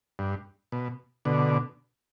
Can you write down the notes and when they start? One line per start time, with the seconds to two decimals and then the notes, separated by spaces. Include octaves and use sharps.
0.19 G2
0.72 B2
1.25 B2 D3